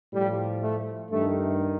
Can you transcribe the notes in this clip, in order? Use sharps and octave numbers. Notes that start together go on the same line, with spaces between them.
A2 F3 G3
A3
G2 D#3 A3